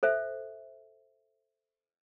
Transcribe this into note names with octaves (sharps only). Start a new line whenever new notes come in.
A4 C5 E5